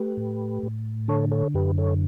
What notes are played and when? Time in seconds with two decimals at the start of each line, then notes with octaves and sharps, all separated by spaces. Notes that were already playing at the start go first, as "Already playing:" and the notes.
Already playing: A3 G4 B4
0.17 A2
0.63 A2
1.08 D3 A4 C#5
1.31 A4 C#5
1.54 F#2 G4 B4
1.78 A4 C#5